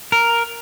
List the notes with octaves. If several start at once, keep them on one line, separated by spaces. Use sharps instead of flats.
A#4